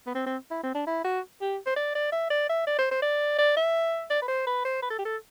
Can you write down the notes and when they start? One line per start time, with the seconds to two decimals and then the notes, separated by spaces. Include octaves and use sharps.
0.07 B3
0.15 C4
0.26 C4
0.51 E4
0.63 C4
0.74 D4
0.87 E4
1.04 F#4
1.41 G4
1.66 C5
1.76 D5
1.95 D5
2.12 E5
2.30 D5
2.49 E5
2.67 D5
2.78 C5
2.91 C5
3.02 D5
3.39 D5
3.57 E5
4.10 D5
4.22 B4
4.28 C5
4.47 B4
4.65 C5
4.82 B4
4.90 A4
4.99 G4
5.05 A4